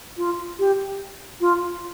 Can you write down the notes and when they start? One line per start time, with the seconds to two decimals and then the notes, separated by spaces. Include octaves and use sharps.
0.17 F4
0.59 G4
1.40 F4